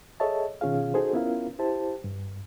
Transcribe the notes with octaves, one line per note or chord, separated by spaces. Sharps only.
G#4 A4 C#5 D#5 E5 A5
B2 D#3 C#4 F4 G#4 F5
D#4 F#4 G#4 A4 C5
B3 C#4 E4 F4 A#4 F5
E4 G4 C5 A5
G2